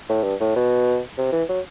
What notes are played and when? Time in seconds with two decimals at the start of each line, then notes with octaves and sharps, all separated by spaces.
0.09 A2
0.24 G2
0.40 A2
0.56 B2
1.18 C3
1.32 E3
1.49 F#3